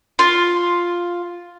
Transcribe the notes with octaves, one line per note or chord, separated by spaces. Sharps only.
F4